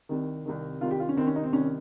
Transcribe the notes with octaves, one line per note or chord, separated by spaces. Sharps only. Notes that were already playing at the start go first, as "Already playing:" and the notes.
C2 C3 D#3
C2 C3 D#3
C2 C3 D#3 F4
G4
F4
C#4
C2 C3 D#3 C4
C#4
D#4
C4
C2 C3 D#3 C#4